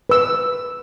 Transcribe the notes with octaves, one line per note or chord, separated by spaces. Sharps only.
B4 E6